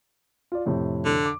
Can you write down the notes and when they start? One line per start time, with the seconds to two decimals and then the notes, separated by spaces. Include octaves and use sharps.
0.52 F4 D5
0.66 F2 A2 C3
1.05 D3
1.26 D6